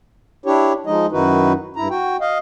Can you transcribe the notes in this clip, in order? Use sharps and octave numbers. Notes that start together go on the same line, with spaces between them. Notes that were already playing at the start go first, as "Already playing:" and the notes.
D4 E4 G4 C#5
F3 G#3 D#4 D#5
F#2 D#3 D#4 E4 F#4 B4
G2 E4 A#5
F#4 G5
D#5 F5